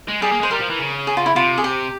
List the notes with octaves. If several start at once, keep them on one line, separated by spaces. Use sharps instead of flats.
G#3
G3 G#4
A#3
G#3 C5
G3 A#4
F3
E3
C#3
G#4
F4
E4
C3 F4
G#4
G4